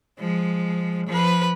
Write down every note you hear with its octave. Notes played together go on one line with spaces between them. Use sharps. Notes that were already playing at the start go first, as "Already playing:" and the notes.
F3 G#3
F3 B4